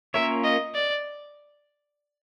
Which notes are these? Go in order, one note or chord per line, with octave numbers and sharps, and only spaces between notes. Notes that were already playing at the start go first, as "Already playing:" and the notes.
A#3 C#4 F4 A#4 C#5 E5
D#5
D5